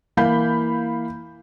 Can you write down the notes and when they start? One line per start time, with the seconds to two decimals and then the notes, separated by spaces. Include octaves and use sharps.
0.17 E3 A#3 F5 B5 G6